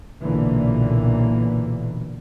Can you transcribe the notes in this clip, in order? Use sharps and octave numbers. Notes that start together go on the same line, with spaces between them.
B1 A#2 D3 E3 A#3